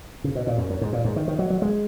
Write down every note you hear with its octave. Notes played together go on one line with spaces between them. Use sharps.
C#3
B2
A#2
F#2
F#2
G#2
A#2
G#2
D#3
D#3
F#3
F#3
G#3